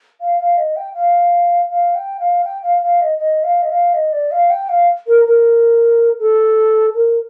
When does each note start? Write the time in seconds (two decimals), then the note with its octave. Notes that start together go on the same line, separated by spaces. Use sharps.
0.21 F5
0.39 F5
0.57 D#5
0.76 G5
0.94 F5
1.70 F5
1.95 G5
2.20 F5
2.44 G5
2.63 F5
2.82 F5
3.01 D#5
3.19 D#5
3.44 F5
3.62 D#5
3.70 F5
3.94 D#5
4.13 D5
4.31 F5
4.50 G5
4.69 F5
5.07 A#4
5.25 A#4
6.19 A4
6.94 A#4